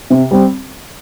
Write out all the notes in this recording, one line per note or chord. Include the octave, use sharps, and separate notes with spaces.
C3
G3 C4